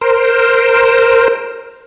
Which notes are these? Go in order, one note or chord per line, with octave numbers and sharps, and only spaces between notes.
A#4 C5